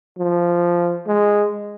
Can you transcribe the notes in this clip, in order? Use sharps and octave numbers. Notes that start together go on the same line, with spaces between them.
F3
G#3